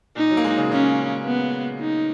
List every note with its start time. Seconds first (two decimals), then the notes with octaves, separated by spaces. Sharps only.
0.16 A#2 D#4
0.30 F#3
0.37 A#3
0.44 G#3
0.58 C#3
0.72 C#3 C#4
1.25 B3
1.80 D#4